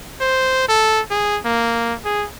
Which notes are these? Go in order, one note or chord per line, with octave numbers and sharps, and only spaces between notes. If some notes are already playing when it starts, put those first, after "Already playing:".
C5
A4
G#4
A#3
G#4